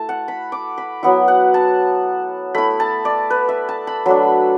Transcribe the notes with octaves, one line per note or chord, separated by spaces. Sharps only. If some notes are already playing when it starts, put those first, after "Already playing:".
Already playing: A3 E4 A5
F#5
B5
D6
B5
F#3 B3 E4 F#5
F#5
A5
A3 E4 B5
A5
D5
B4
E5
A5
B5
F#3 A3 D4 B5